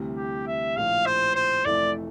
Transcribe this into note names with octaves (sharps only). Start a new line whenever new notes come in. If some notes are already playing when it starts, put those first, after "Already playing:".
Already playing: D2 C3 E3 G3
G4
E5
A#1 A2 F3 F5
C5
C5
F1 F2 E3 A3 E4 D5